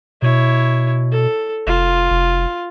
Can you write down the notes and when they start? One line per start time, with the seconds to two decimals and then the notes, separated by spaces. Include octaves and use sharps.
0.22 B2 E4 C#5
1.12 A4
1.67 F1 F4
2.10 F1